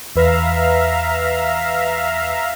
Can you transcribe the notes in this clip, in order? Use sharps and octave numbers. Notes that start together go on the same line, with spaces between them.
E2 B4 E5 F5 A#5